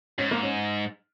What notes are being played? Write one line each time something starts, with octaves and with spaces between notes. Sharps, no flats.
G#2 C#4
A#3
C#4